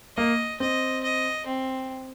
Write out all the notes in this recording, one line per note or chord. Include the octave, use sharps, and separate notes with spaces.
A#3 D#5
C4 D#5
D#5
C4